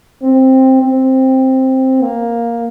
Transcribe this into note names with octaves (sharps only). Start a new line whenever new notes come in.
C4
C4
A#3